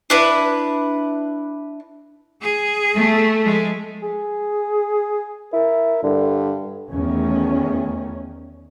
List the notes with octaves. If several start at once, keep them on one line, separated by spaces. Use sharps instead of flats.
D4 E4 B4
G#4
A3
F3 G#3
G#4
E4 A#4
G2 D3
E2 D#3 A3 C#4